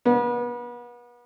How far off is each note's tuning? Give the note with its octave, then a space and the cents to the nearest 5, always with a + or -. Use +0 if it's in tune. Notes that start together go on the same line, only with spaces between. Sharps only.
B3 -35